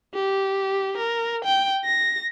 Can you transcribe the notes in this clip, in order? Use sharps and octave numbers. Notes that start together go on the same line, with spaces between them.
G4
A#4
G5
A#6